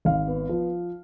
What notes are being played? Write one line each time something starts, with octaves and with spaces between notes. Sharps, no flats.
G#1 F5
B3
F3